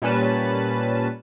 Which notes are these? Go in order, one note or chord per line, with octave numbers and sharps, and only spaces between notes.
A#2 G3 C#4 B4 A5